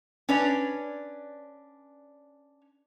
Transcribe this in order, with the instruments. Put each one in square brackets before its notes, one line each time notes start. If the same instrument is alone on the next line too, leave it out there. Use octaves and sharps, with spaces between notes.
[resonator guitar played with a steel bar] C#4 D4 B4 C#5 D5